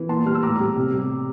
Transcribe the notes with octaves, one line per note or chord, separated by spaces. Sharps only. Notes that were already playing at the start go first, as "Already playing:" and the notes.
Already playing: E3
A#2 A5 C6
G3 F6
E6
A2 A#5 D6
G3
C3
G3